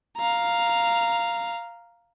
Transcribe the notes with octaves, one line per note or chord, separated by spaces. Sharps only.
F5 A#5